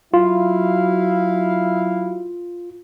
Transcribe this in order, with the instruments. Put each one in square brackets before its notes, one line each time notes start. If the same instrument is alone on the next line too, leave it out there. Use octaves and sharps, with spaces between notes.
[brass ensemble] F#3 E4 F5 [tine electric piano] F4